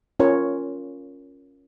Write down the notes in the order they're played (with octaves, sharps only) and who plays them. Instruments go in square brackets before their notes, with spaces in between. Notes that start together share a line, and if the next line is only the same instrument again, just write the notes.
[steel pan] C#4 F4 A#4 C#5